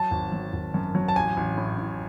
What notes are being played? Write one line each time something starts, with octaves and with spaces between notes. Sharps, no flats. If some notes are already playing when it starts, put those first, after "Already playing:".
Already playing: F#3 A5
G#1
F#3
G#1
F#2
F#3
A5
A1 G#5
A1
A2
A2